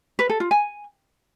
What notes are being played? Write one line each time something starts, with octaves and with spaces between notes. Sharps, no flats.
B4
A4
F4
G#5